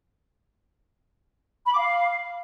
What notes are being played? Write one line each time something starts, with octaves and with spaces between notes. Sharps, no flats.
B5
D6
F5